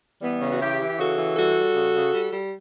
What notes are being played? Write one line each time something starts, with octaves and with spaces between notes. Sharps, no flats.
E3 G3 B3
C#3
F#4
E3 E4 G4
E3
G4
C#3 F#4 A4
E3
G3 F#4 A4
G3
C#3
C#3
G3
G3